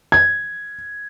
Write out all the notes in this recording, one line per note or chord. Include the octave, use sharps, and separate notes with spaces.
G#6